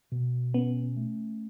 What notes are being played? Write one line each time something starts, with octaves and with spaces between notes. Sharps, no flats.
B2
B3 C#4
A3